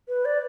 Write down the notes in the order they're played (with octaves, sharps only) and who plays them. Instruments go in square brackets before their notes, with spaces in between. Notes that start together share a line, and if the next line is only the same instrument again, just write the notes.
[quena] B4
D5